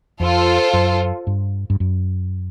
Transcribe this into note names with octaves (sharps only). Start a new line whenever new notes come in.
F2 F4 A4 C5
F#2
G2
G2
F#2